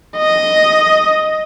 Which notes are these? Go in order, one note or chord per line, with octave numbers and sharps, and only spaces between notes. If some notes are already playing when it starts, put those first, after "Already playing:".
D#5